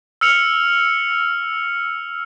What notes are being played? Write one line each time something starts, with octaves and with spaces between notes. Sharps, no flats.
E6 F6 C#7 F7